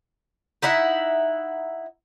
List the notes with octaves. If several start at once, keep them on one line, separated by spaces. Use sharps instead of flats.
D#4 E4 E5 F#5